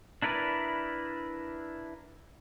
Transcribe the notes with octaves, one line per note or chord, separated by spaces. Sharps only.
D4 E4 A#4 B4 D5